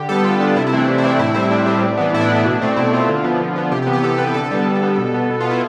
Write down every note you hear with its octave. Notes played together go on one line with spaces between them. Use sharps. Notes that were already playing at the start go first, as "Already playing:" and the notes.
Already playing: D3 G4
G3 B3 A4
D3 F4
G3 B3 D4
C3 E4
E4
E3 A3 C4 D4
C3
E4
E3 A3 C4 D4
A2 E4
G3 C4 E4
A2 D4
G3 C4
A2
E3 B3
A2 E4
D4
E3 B3
D4
B2
A3 C4
B2 E4
A3 C4 F4
D3
F3 B3
D3
F3 B3
C3 G4
G4
E3 B3
G4
C3 A4
E3 B3 B4
D3 A4
G3 B3
D3
G3 B3
B2
B3
B2
F4
B3
E4